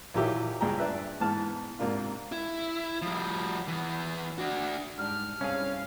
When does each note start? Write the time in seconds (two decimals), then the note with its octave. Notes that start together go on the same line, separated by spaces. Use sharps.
0.14 A#1 D#3 E3 F#3 G4 E5
0.60 C#2 G2 G#4 G5 A#5
0.78 D4 B4 E5
1.20 G#2 E3 B3 A5 F6
1.79 G#2 C3 A#3 D4 F4
2.32 E4
3.02 F3 G3
3.68 E2 E3
4.38 D4 F#4
4.98 G#2 G3 D4 F6
5.41 C2 G2 C#4 G#4 F5